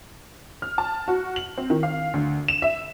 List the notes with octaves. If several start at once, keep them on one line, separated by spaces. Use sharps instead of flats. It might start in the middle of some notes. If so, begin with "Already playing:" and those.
F6
A5
F#4
F#7
C4
D#3
F5
D2
E7
E5